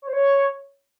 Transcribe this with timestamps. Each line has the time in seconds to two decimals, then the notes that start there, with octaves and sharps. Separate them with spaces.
0.02 C#5
0.08 C5
0.13 C#5